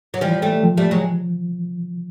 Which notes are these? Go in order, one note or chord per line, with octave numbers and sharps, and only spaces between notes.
F#3
E3 F3 G3
G3 A3
F3
G3 A3
F#3 G#3